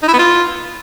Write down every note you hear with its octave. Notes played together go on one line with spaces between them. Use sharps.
D#4
E4
B3
F4